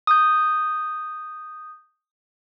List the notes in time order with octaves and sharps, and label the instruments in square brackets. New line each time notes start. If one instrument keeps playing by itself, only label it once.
[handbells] D#6 G6